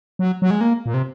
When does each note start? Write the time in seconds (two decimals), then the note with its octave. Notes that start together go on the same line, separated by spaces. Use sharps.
0.19 F#3
0.42 F#3
0.51 G#3
0.61 A#3
0.86 A#2
0.94 C3